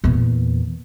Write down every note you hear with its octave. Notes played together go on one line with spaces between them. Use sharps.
E2 A#2